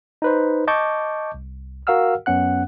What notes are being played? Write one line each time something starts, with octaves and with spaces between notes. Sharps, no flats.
D#4 B4 C5
D#5 A5 C#6 D6 G6
C2
F#4 A#4 F5 F#5 E6 F6
F#2 B3 C#4 F#5 F#6